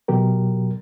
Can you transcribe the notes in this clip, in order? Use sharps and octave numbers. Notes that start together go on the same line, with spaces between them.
B2 F#3 G4 A#4